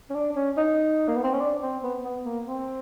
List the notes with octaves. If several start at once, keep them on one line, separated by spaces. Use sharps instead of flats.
C#4
D4
C#4
D#4
A#3
B3
C4
C#4
D4
C4
B3
B3
A#3
C4